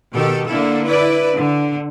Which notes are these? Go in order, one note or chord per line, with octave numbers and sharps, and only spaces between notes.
B2 D#3 G4 A4
D3 A#3 E4 A4
E4 B4 D5
D3